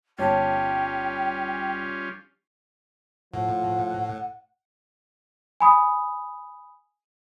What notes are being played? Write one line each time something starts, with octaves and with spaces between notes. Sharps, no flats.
G1 G3 C#4 F4 C#5 G5 A5
A2 F3 F#5
G#5 B5 D#6